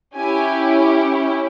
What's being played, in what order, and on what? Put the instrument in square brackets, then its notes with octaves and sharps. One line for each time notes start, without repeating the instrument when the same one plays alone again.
[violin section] C#4 E4 G4 G#5